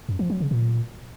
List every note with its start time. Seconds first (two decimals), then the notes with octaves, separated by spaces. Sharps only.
0.09 F#2
0.19 F3
0.30 F#3
0.40 C#3
0.51 A#2